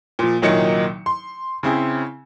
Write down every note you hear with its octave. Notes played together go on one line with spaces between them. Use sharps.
A#2 F3
C2 A#2 D#3 F#3 D#4 C#7
C6
C#3 C4 E4 G#4